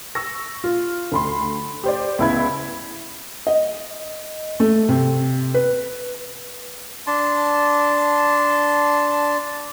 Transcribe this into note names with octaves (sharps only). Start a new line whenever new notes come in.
C#6 E6 A#6
F4
D2 B5 C6
G4 C5 D5
C#2 B3 E4 B5 G#6
D#5
A3
C3
B4
D4 A5 C6